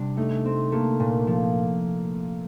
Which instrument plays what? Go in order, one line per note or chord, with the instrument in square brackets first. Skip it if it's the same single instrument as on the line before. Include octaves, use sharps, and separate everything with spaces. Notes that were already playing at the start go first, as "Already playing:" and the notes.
Already playing: [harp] C3 G3 D4
[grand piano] A3 [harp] D#4
[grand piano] A3 [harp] C4
[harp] A3 [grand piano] A#3
[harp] A#2
F3